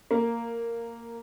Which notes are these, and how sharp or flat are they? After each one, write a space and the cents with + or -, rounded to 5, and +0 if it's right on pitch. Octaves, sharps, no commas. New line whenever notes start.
A#3 -10